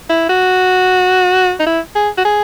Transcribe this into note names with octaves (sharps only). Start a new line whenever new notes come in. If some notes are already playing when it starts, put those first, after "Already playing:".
E4
F#4
D#4
E4
G#4
F#4
G#4